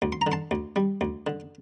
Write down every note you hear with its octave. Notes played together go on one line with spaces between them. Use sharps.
D2
C6
A#5
D3
A5 C6
D2
G3
D2
D3